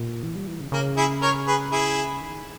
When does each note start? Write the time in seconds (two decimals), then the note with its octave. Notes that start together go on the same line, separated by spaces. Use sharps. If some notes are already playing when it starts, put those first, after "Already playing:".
Already playing: A#2
0.23 E3
0.35 G3
0.47 E3
0.60 C#3
0.72 C#3 A#3
0.97 E4 G#4
1.22 A#4 C#5
1.47 G#4 B4
1.72 E4 G#4
2.21 D#3